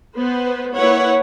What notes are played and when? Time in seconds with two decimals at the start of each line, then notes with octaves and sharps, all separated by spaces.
0.17 B3 B4 C5
0.74 A#3 E4 B4 C#5 F#5